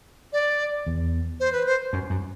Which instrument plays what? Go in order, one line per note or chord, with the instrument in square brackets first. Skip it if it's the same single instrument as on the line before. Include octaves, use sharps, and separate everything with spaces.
[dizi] D5
[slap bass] E2
[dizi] C5
B4
C5
[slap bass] F#2
F#2